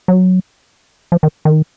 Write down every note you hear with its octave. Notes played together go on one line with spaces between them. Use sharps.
F#3
F3
D#3
D#3